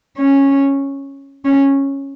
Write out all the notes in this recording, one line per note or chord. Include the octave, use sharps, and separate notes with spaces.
C#4
C#4